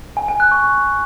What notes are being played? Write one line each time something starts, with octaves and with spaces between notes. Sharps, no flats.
G#5
G#5
F#6
C#6